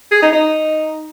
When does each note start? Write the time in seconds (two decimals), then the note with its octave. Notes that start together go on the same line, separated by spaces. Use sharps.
0.12 G#4
0.22 D#4
0.33 D#4